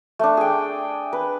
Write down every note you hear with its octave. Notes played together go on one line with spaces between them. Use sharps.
A3 D4
G#4 G5
B4